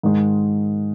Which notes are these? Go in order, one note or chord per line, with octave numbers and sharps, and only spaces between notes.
G#2 D#3 G#3